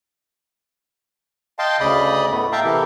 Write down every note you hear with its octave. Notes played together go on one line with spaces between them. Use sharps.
D#5 F5 G5 A5 C6
D2 C#3 D5 D#5 B5 D#6
A2 A3 B3
E5 F5 G5 A5 A#5
C3 E3 E4 G4 A4 A#4